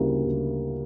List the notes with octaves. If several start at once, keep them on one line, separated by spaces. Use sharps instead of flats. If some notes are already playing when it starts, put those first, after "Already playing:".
Already playing: D2 C#3 G3 A#3 E4
D2